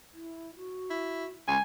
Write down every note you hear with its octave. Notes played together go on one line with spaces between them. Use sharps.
E4
F#4
E4
C#2 G#3 G#5